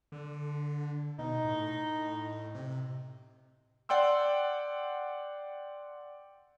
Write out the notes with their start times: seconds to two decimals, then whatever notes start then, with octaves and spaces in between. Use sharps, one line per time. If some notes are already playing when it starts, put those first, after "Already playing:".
0.12 D3
1.19 B2 D#4
1.45 A2
2.55 C3
3.89 D5 F#5 G5 C6 E6